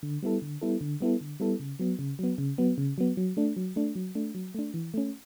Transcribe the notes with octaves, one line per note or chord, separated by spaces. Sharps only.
D3
G3 B3 E4 A4
D3
G3 B3 E4 A4
D3
G3 B3 E4 A4
D3
G3 B3 E4 A4
C#3
F#3 B3
C#3
F#3 B3
C#3
F#3 B3
C#3
F#3 B3
F#3
A3 D4
F#3
A3 D4
F#3
A3 D4
F#3
A3 D4
E3
A3 C#4